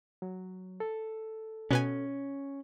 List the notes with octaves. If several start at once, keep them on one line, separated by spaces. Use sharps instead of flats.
F#3
A4
B2 C#4 B4 G#5